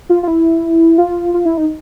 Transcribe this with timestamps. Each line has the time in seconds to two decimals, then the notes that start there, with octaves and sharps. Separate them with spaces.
0.09 F4
0.23 F4
0.28 E4
0.98 F4
1.34 F4
1.45 E4
1.57 D#4